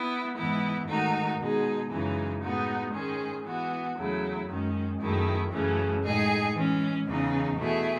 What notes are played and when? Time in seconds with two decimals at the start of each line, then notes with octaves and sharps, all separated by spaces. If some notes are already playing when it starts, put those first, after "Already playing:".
Already playing: B3 E4
0.36 G#2 E3 B3 E4
0.87 G#2 D#3 A3 D#4 F#4
1.39 B2 G#3 D#4 G#4
1.90 F#2 C#3 E3 G#3 D#4
2.41 A2 G#3 B3 D#4 F#4
2.93 G#2 D#3 G#3 C#4 G#4
3.44 E3 B3 F#4
3.96 E2 C#3 F#3 A3 E4
4.47 F#2 D#3 G#3 C#4
4.99 F#2 D#3 A3 E4 G#4
5.50 F#2 C#3 E3 A3 C#4
6.02 A2 G#3 D#4 G#4
6.53 E3 G#3 C#4
7.05 E2 C#3 E3 G#3 D#4
7.56 B2 A3 E4 G#4